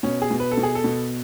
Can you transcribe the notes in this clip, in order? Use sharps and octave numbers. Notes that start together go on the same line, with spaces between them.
B2 C#4
G#4
B2
B4
A4
B2
G#4
A4
B2